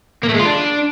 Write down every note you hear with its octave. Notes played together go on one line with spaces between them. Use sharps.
A#3
A3
G#3
F4
D4